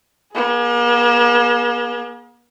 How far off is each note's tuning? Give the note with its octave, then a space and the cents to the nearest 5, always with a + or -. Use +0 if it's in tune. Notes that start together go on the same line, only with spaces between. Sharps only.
A#3 +45 G#4 +0